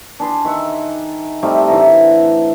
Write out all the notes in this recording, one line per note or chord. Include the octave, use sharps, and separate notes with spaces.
D4 G#4 B5 C6
D#3 E5 F#5
C3 G3 A3 D#4
A2 D3 E3 A#5